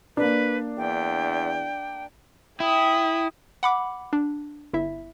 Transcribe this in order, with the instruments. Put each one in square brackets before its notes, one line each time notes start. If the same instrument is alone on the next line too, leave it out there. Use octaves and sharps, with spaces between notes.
[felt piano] A#3 D4 [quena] B4
[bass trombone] E2 [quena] G5
[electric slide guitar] E4 [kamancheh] G5 D#6
[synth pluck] F#5 B5 D6
D4
G1 E4 E5